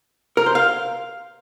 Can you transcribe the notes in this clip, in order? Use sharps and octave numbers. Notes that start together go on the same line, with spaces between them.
A#4
C5
F5